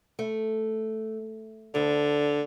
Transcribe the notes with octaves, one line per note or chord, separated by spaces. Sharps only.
A3
D2 D3